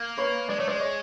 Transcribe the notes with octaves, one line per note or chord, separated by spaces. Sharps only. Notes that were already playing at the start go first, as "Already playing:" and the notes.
Already playing: A#3
B4 C#5
G#3 D5
A3 C#5
G#3 C5 D5
C#5 D#5